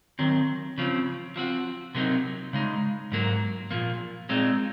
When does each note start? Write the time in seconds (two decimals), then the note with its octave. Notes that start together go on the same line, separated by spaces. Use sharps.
0.19 D#3 F#3 C4
0.78 C#3 F3 C4
1.36 F3 C4 F#4
1.95 C3 F#3 A#3 D#4
2.53 C#3 G#3 D#4
3.12 G#2 F#3 A#3
3.71 A#2 F3 A#3
4.29 A#2 G#3 C4 D#4